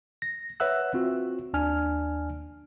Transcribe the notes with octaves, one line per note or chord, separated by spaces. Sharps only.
A#6
B4 C#5 E5 F#5 E6 F#6
C4 F4 F#4
D#2 D4 G#5 F6